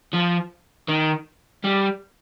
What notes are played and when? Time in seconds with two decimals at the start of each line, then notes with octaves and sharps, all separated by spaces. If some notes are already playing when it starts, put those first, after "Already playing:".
0.13 F3
0.88 D#3
1.64 G3